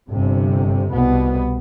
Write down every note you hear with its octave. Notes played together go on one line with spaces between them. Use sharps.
G1 C3
C2 B2 B3